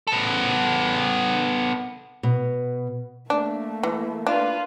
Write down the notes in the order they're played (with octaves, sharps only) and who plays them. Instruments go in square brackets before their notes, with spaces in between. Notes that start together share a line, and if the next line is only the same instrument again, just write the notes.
[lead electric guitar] B3 A4
[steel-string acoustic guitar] B2
[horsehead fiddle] A3 A#3 [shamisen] D4
[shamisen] E3
[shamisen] D4 [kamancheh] F4 B4